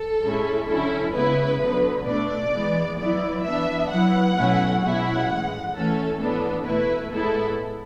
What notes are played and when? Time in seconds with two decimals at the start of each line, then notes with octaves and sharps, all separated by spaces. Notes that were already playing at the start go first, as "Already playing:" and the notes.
Already playing: A4
0.22 A2 G#3 C#4 E4
0.67 D3 F#3 C#4 E4 A4
1.14 C#3 G#3 B3 E4 B4
1.60 D3 F#3 B3
2.06 B2 A3 D4 D5
2.52 E3 G#3 B3
2.98 F#3 B3 E4 D5
3.43 E3 B3 D4 E5
3.90 F#3 B3 E4 F#5
4.35 B2 F#3 A3 C#4 E4
4.82 B2 G#3 C#4 E4 F#5
5.28 A2 E3 G#3
5.73 E3 A3 C#4 A4
6.20 A2 E3 B3 D4 A4
6.65 B2 A3 E4 B4
7.12 A2 G#3 B3 E4 A4